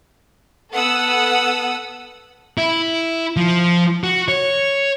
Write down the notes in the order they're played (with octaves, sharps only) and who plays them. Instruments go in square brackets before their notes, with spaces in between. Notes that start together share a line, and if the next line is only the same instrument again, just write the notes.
[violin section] B3 A4 F#5 D#6 E6
[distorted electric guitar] E4
F3
F#4
C#5